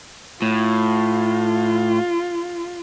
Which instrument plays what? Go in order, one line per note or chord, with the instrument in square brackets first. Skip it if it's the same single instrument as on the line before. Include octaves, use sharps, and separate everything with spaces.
[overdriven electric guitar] A2 [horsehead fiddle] F4